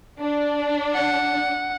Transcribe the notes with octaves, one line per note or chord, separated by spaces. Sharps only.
D4
F#5